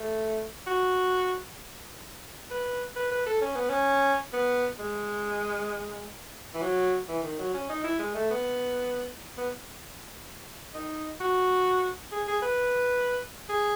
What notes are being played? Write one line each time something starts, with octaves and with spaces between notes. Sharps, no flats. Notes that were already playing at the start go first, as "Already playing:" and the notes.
Already playing: A3
F#4
B4
B4
B4
A4
C#4
B3
C#4
B3
G#3
E3
F#3
E3
D#3
F#3
C#4
D#4
E4
G#3
A3
B3
B3
D#4
F#4
G#4
G#4
B4
G#4